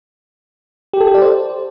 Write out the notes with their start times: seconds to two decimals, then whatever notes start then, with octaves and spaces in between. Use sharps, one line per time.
0.93 G4
1.00 A4
1.08 G4
1.15 D5
1.22 C5